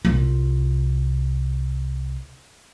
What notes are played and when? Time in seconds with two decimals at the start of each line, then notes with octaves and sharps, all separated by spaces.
0.05 C2 F4